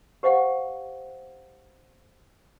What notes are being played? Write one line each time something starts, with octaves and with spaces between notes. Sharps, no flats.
G4 C5 D#5 F5 F#5